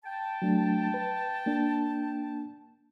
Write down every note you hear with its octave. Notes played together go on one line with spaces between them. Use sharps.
G5 A5
F#3 A3 D4
B4
A#3 D4